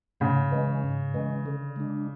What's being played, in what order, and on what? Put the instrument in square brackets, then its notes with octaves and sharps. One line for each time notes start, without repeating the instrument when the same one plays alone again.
[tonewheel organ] G#2 [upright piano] C#3
[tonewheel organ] E3 G#3 C#4
G#2
E3 G#3 C#4
D3
G#3 D4